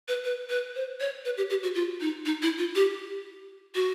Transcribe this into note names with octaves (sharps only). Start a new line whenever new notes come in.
B4
B4
B4
C5
C#5
B4
G4
G4
F#4
F4
D#4
D#4
E4
F4
G4
F#4